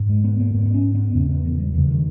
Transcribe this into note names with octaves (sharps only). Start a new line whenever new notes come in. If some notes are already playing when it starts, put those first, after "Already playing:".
Already playing: G#2
G#3
B3
A#3
G#2 B3
B3
C#4
B3
E2 C#3 C#4
B3
E3
G3
E2 C#3 E3
D#3